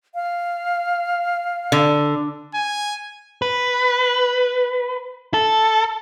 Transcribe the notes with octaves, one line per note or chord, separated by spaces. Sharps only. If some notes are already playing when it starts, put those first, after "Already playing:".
F5
D3
G#5
B4
A4